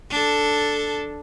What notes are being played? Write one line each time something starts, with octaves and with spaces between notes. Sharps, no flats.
D4 A4